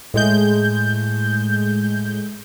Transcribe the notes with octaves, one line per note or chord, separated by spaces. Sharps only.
A2 G#3 G6